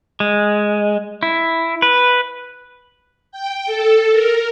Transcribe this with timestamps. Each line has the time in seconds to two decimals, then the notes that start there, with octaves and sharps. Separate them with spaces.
0.20 G#3
1.23 E4
1.82 B4
3.32 G5
3.66 A4
4.12 A#4